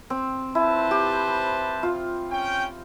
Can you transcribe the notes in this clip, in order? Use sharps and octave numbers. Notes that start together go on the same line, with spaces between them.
C4
E4 B4 C5 A5
G4
F4
C#4 G5